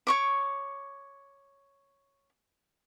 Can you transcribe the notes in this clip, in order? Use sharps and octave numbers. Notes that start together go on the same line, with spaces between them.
C#5 C#6 D6